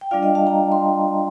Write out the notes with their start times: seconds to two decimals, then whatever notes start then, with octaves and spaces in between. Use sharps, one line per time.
0.01 G5
0.11 G3 D4 F4 D5 F5
0.23 D#5 G5
0.35 F5 A5
0.46 G5 A#5
0.72 C6